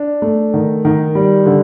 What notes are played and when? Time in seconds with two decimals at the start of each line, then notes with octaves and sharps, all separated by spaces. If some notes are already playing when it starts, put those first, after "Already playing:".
Already playing: D4
0.22 A3
0.54 D#3
0.85 D#3
1.15 G3
1.46 D3